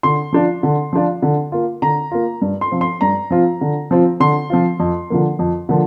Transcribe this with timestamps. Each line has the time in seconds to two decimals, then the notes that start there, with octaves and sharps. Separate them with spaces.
0.03 D3 C6
0.33 F3 D4 F4
0.63 D3
0.93 F3 D4 F4
1.22 D3
1.52 A#3 F4
1.82 D3 A#5
2.11 A#3 F4
2.42 G2
2.61 C6
2.71 F3 C4 F4
2.81 C6
3.01 G2 A#5
3.31 F3 C4 F4
3.61 D3
3.91 F3 C4 F4
4.20 D3 C6
4.50 F3 C4 F4
4.80 F2
5.10 D3 F3 A#3
5.39 F2
5.69 D3 F3 A#3